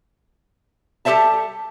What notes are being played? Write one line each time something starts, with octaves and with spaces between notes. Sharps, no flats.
G3 G4 A4 C5 E5 A5